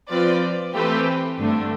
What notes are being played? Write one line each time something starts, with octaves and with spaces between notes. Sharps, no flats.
F3 C4 F4 B4 D5
E3 A3 C4 G4 B4
G2 D3 A3 D4